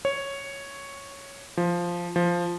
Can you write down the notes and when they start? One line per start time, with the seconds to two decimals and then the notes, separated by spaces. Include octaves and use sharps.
0.05 C#5
1.57 F3
2.16 F3